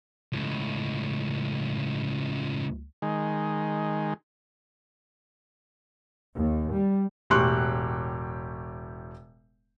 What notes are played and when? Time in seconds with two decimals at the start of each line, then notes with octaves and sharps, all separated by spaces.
0.32 C#2 A2
3.02 D#3 G#3
6.36 D#2
6.73 G3
7.30 E1 A2 G4 C6 C#6 F#6